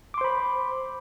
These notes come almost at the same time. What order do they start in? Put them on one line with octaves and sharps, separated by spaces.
D6 C6 C5 B5